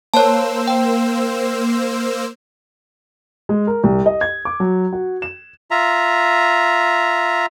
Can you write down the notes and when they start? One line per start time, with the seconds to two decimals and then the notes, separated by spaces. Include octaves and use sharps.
0.14 A#3 C5 C#5 A5 E6
0.68 G5
3.49 G#3
3.67 A#4
3.84 C2
4.06 D#5
4.21 G#6
4.45 D6
4.60 F#3
4.93 F#4
5.22 E7
5.71 F4 E5 A#5